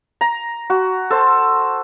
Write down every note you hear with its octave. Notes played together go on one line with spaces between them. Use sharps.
A#5
F#4
A4 C5 A5